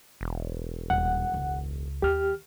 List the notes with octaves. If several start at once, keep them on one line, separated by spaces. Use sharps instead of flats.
E1
D#1 F#5
C#2
D#2 G4 F6